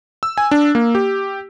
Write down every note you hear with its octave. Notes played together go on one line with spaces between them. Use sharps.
E6
G#5
D4
A#3
G4